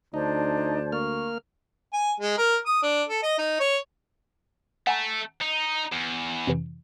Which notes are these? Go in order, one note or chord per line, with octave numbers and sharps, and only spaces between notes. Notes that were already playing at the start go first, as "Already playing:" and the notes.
D2 D4 D#4 C5 D5 A5
A#3 C#6 F6
G#5
G#3
A#4
D#6
D4
A4
D#5
D#4
C#5
A3 F#5 G#5 A#5
D#4
E2
F2 C3 E3